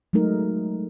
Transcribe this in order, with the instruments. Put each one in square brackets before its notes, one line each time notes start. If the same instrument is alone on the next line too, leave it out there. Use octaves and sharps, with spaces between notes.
[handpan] F#3 G#3 A3 D#4 A#4